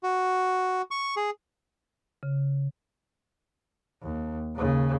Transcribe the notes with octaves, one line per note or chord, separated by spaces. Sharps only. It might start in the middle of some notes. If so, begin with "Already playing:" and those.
F#4
C#6
G#4
C#3
D#2
D#2 C#3